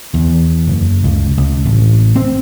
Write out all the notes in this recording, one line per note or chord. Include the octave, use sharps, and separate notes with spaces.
E2
F#1
C#2
C#2
A1
C4